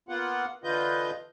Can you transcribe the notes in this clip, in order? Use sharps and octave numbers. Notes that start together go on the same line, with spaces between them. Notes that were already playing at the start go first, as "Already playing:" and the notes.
A#3 B3 F4 F#5
D3 E3 F4 B4 D#5 G6